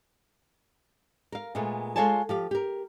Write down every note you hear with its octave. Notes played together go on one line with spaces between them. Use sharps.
A#4 F5
A#2 G#3 A3 B3
G#3 F4 A4 C#5 G#5 A5
F3 G4 F5
G4 A#4